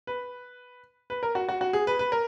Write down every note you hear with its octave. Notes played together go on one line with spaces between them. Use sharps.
B4
B4
A#4
F#4
F#4
F#4
G#4
B4
B4
A#4